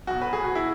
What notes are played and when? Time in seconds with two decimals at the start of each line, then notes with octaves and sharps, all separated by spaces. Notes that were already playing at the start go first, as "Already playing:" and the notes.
0.07 B1 B2 F#4
0.22 B4
0.33 G#4
0.44 F#4
0.55 E4